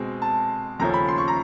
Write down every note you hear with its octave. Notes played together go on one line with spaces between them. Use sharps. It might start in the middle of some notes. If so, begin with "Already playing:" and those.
Already playing: B2 G#3 C4
A5
D#2 C#3 F3 A3 C#4 A#5
B5
C6
C#6
A#5